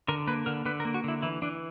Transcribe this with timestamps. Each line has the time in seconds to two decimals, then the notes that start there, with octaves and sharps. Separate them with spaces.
0.08 D3 A#4
0.27 A#3 B4
0.46 D3 A#4
0.66 D3 B4
0.80 A#4
0.85 A#3
0.94 F#4
1.04 D3 E4
1.22 E3 E4
1.42 E3 D4